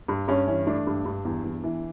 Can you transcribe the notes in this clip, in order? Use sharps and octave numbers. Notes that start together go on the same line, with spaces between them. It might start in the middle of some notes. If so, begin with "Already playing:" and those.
G2
G2 C#4
E3 C#4
A3 D4
G2
G2
E2
E2
E3